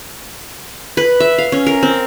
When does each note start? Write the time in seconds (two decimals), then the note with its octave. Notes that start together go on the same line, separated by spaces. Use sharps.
0.97 B4
1.20 E5
1.38 F5
1.52 C#4
1.67 A#4
1.83 C4